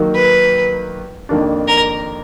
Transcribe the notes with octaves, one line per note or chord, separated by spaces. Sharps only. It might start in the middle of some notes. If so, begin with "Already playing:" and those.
Already playing: D#3 F#3 A#3
B4
F2 D#3 A#3 D4
A#4